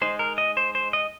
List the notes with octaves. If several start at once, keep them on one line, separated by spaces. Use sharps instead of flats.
G#3 D#4 C5
A#4
D#5
C5
C5
D#5